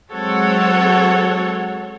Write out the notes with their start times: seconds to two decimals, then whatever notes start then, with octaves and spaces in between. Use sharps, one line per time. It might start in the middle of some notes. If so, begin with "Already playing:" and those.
0.12 F#3 G#3 C4 A4 C#5 F#5